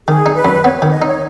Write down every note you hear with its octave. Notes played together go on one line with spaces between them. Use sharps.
D#3 G#4
D#4
B4
F#2
B3 C#5
D#3 C#5
D#5
D#4 C#5